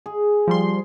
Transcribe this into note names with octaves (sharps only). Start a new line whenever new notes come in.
G#4
F3 G3 C6